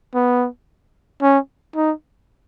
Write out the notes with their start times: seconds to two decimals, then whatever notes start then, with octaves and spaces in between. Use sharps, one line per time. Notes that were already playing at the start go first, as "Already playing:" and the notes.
0.15 B3
1.22 C#4
1.76 D#4